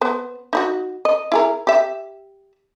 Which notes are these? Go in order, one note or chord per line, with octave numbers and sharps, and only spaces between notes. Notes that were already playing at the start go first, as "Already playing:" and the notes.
B3 C5
D#4 E4 F#4
D#5
E4 G#4 A#4
G4 E5